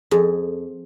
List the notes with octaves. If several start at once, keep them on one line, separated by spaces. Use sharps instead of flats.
F2 G#4